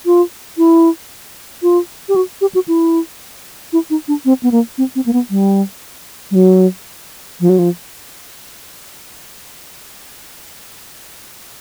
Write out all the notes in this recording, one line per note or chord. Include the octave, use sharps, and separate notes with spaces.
F4
E4
F4
G4
F#4
G4
F#4
E4
E4
D#4
D4
C4
B3
A#3
C4
C4
A#3
B3
G3
G3
F#3
F3
F#3
F3